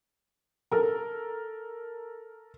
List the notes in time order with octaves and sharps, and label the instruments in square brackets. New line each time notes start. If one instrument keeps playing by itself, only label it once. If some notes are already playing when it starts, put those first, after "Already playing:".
[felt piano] A4 A#4